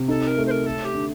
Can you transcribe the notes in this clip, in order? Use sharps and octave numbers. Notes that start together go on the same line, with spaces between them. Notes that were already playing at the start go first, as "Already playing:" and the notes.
Already playing: C3
D#4 A4
A#4
A3
C5
A#4
A3 A4
G4
D3